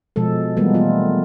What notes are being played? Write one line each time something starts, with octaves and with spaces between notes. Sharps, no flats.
B2 F3 G#3 A4
E3 F3 G3 G#3 A#3 B3
A3 B3 F4